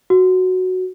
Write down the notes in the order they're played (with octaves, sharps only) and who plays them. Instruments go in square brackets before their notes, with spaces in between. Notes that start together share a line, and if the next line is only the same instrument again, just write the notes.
[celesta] F#4